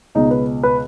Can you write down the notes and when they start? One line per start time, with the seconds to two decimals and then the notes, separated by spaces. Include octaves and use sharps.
0.15 C#2 B2 D#4
0.31 B4
0.63 B4